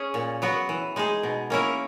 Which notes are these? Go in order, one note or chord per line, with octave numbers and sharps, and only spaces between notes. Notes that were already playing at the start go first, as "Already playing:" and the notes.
Already playing: C#4 G#4
A#2
F#3 B3 F#4
E3
G#3 D#4 G#4
B2
A#3 C#4 E4 A#4